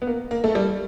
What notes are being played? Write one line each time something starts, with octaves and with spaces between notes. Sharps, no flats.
B3
A#3
A#3
A3
G3